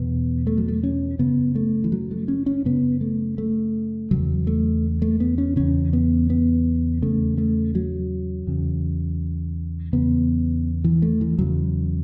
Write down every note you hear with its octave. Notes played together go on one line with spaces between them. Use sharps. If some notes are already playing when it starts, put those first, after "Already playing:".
Already playing: E2 B2 B3
A3
F#3
A3
C#4
F#2 C#3 B3
A3
E3
F#3
A3
C#4
C#4
F#2 C#3 B3
A3
A3
E2 C#3 F#3
A3
A3
B3
C#4
E2 C#3 C#4
B3
B3
E2 C#3 A3
A3
F#3
E2 C#3
E2 C#3 B3
E3
A3
E3
E2 C#3 F#3